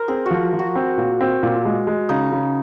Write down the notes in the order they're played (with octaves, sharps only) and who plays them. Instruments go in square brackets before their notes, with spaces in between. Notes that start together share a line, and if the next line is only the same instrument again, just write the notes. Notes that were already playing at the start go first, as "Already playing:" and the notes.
Already playing: [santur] A#4 C5
[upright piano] C4 [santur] G#4
[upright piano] F3 [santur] F#4
[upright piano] F3
[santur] F#4
[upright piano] C4
A#2
C4
A#2
G#3
G#3
[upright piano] C#3 [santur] D#4
[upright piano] C#3